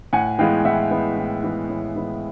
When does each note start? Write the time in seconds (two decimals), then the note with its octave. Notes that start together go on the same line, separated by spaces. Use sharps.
0.13 A2 F#5 G#5
0.39 E3 G#3 B3 F5 G5
0.65 A2 E5 F#5
0.91 E3 G#3 B3
1.17 A2
1.43 E3 G#3 B3
1.69 A2
1.96 E3 G#3 B3